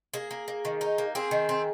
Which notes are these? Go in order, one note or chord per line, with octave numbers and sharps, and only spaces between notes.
A#3 G#4
A#3
A#3
D#3
D#4
A#3
C4 G#4
D#3
C4